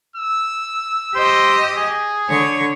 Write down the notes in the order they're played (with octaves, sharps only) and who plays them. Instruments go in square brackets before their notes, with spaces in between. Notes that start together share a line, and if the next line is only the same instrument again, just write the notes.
[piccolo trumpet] E6
[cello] G4 D#5 [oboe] C5
[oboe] G#4
[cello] D3 C#5